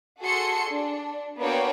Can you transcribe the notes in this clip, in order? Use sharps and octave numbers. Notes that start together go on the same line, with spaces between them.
F#4 G#4 A4 C6 C#7
D4
A#3 B3 D4 F#4 C#5 G5